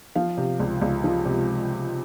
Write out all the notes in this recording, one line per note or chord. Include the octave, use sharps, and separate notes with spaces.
F3 F5
C3
C#2
C#2
F3
C3